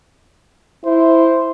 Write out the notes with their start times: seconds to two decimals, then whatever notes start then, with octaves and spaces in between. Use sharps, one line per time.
0.85 E4 C5